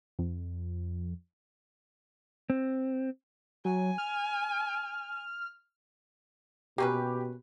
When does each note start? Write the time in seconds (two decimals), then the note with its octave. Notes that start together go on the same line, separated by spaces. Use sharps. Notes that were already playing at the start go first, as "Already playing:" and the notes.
0.19 F2
2.50 C4
3.65 F#3 G#5
3.98 F6
6.78 B2 A#3 C#4 G4 B4